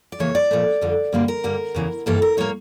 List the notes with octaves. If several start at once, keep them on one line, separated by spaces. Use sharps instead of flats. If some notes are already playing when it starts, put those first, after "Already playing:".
D5
F2 C#3 E3 A#3 C#5
D5
A#2 F3 A3
F2 D3 G3
G2 D3 G3 A#3
A#4
G2 D3 G3 A#3
E2 C#3 E3
G2 E3 G3 A#3 A4
A#4
A2 G3 A#3 C#5